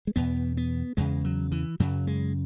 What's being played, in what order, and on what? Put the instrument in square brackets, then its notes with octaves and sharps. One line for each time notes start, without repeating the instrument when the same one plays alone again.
[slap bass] G#3
E2 B2 B3
B3
E2 C#3 G#3
F#3
E3
F#2 C#3 F#3
G#3